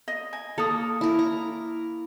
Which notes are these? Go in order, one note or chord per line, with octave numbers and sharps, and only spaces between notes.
D#5
G#5
A#3 A4 D#6
E4 A#4
A#5